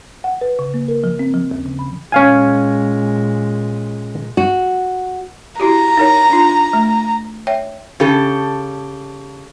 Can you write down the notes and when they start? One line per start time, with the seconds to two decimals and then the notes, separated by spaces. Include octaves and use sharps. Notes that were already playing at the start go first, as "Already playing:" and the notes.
0.24 F#5
0.41 B4
0.59 C#3
0.74 A#3
0.88 A#4
1.04 F3
1.19 C4
1.34 F3
1.51 D#2
1.66 C#3
1.79 B5
2.12 A#2 G#3 C#4 F5 G#5
4.37 F#4
5.60 E4 F#4 G4 A#5
5.97 D#4 A#4 C#5
6.30 D4 F4
6.73 A3
7.47 C#5 E5 G5
8.00 C#3 G4 A4